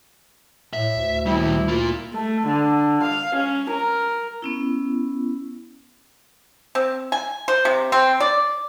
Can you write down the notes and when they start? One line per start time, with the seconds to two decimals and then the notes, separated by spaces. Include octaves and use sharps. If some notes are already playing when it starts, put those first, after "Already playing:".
0.73 A2 E5
0.96 D2
1.26 D#3 G3 E4
1.68 A#3 F4
2.14 A3
2.46 D3
3.02 F5
3.35 C#4
3.70 A#4
4.42 B3 C#4 E4
6.75 C4
7.12 G#5
7.48 C5
7.65 C3
7.92 C4
8.20 D5